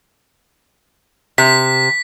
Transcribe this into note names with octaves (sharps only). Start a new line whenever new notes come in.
C3 B6